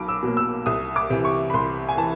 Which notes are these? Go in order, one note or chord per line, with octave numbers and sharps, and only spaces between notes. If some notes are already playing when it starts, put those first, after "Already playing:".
Already playing: B1 B2 B5 D6
E6
B2 F#3 A#3
E6
C2 D#6
D6
C3 E3
C#6
B5
C2 C6
G#5
E3 A5